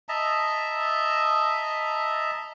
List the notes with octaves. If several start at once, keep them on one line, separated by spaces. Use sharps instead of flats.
D#5 E5 A5 A#5